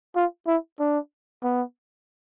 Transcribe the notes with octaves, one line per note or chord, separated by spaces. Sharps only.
F4
E4
D4
B3